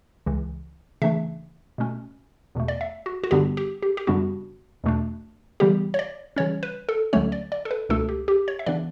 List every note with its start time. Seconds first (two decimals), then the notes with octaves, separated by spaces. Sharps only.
0.26 C#2 C#3 E3
1.02 C#3 E3 A3 D4 E5
1.78 B2 A3 C#4
2.55 E2 B2 A3
2.68 D5
2.81 E5
3.06 F#4
3.24 F#4
3.31 G2 D3 G3 B3 D4 G4
3.57 G4
3.82 G4
3.97 G4
4.07 F#2 C#3 G3 B3 D4 F#4
4.84 E2 B2 A3 D4
5.60 C#3 E3 G3 B3 G4
5.94 C#5
5.99 D5
6.36 C#3 E3 G3 C#4 C#5
6.63 B4
6.89 A4
7.13 D2 D3 F#3 A3 C#4 C#5
7.32 D5
7.52 D5
7.65 A4
7.71 B4
7.89 C#2 B2 A3 D4 A4
8.09 G4
8.28 G4
8.48 C#5
8.59 E5
8.66 C#3 E3 B3 D4 D5